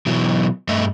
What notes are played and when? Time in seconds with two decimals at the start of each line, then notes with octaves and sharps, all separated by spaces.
0.06 B2 E3 F#3
0.68 G2 A3 D#5 E5